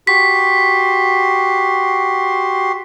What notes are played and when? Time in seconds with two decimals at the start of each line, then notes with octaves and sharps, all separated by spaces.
0.07 F#4 G4 C6 B6